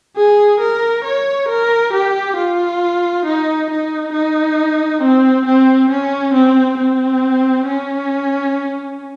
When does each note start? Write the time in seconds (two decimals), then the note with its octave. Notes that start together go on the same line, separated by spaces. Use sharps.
0.16 G#4
0.60 A#4
1.05 C#5
1.49 A#4
1.93 G4
2.36 F4
3.25 D#4
3.70 D#4
4.13 D#4
5.02 C4
5.46 C4
5.90 C#4
6.34 C4
6.78 C4
7.67 C#4